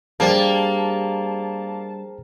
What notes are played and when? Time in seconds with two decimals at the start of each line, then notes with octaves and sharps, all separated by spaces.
0.20 G3 A#3 D4 G#4 C5 G5 A5